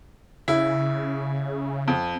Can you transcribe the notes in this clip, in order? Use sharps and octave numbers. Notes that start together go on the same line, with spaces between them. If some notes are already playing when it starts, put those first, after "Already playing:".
C#3 E4
F2